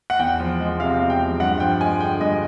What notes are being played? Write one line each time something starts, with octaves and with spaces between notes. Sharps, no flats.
F#5
E2 G5
F3
G#3
C3 F5
E2
G5
F3
G2 F#5
F3 G5
G#3 G#5
D3 G5
G2 D#5